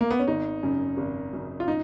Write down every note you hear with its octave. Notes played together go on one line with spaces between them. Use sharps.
A#3
B3
C#4
G#1 D#4
F#2 C#3
G#1
F#2 C#3
F4
D#4